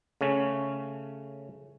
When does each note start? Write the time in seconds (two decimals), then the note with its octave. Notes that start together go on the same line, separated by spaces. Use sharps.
0.21 C#3 A3 C#4